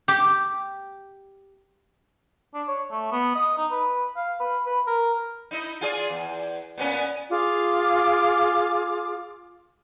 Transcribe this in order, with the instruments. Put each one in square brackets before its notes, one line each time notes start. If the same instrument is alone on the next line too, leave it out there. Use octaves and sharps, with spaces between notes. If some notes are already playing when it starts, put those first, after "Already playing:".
[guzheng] G4
[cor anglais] D4
C#5
A3
B3
D#5
D#4
B4
F5
B4
B4
A#4
[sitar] D#4 E4 D#5
F4 G#4 D5
E2
A#2 B3 C#4
[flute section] F4 G#4 D6